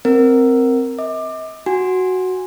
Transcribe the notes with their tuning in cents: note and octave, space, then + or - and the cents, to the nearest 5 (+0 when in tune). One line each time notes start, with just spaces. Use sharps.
C4 +0 A#4 +0
D#5 +45 D6 +20
F#4 +0 G#5 -15